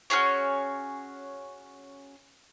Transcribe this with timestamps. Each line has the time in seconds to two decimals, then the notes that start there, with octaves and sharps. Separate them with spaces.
0.10 C#4 F#4 G#4 C#5